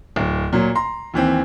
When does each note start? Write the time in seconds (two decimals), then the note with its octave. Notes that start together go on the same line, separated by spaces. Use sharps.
0.16 D1
0.53 A#2 F#3
0.75 A#5 C6
1.14 D#2 E3 C4